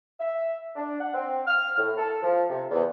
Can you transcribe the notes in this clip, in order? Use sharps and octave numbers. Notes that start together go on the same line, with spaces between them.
E5
D4
F#5
C4
F6
A2
A4
F3
C3
E2